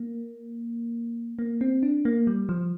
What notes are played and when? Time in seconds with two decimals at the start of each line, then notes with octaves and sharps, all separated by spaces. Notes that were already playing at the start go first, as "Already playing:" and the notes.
Already playing: A#3
1.39 A#3
1.61 C4
1.83 D4
2.05 A#3
2.27 G3
2.49 F3